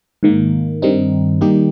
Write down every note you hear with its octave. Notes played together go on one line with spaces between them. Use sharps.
G#2 D#3 A#3
G2 D#3 G3 C4 D#4
D#3 G3 A#3 D#4 G4